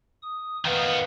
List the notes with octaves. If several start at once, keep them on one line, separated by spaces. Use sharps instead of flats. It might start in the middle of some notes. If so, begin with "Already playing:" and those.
D#6
D#3 B3 B4 F5